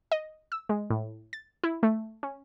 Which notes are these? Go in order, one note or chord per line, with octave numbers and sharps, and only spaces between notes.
D#5
E6
G#3
A2
A6
E4
A3
C#4